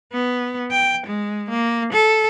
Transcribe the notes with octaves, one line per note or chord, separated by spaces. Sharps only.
B3
G5
G#3
A#3
A4